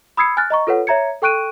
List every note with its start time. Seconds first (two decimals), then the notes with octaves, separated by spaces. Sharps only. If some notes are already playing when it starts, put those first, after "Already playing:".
0.17 B5 D#6 E6 G#6 C7 C#7
0.37 G#5 F6 F#6 A6
0.50 D#5 A#5 C#6
0.67 F4 A4 B4 C#5 F#5
0.87 C#5 E5 A#5 G#6 C#7
1.22 A4 G5 C#6 F#6 D7 D#7